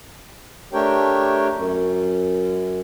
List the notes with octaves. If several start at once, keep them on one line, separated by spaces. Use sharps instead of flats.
A3 D4 G4 A#4 C#5 G5
F#2